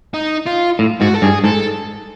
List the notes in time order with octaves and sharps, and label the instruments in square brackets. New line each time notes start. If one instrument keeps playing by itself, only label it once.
[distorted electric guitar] D#4
F4
[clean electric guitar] A2
[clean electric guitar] G#2 [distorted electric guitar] F#4
[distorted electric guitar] A4
[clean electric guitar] G2 [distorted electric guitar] G#4
[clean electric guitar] G#2 [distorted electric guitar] A4